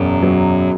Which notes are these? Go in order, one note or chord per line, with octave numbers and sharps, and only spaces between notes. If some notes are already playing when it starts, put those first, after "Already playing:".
Already playing: E1 F#2
F#3